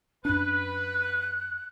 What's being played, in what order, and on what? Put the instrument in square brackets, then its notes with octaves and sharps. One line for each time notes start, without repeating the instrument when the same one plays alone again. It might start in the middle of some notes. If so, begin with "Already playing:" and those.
[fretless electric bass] F#2 D4 [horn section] B4 [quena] F#6